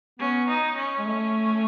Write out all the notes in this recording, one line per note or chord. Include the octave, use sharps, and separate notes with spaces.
B3 C#4
D#4
C#4
G#3
A3